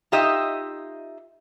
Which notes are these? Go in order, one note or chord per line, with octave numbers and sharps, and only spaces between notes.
D#4 F4 G4 D#5 E5